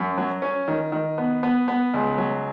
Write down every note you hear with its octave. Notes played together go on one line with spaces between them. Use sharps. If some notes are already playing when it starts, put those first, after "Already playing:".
Already playing: F#2
F#3
C#4
D#3
D#3
B3
B3
B3
C#2
F#3